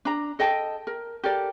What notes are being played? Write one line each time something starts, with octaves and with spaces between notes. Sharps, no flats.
D4 A#5
A4 D#5 G5 A5
A#4
G4 A4 A#4 D5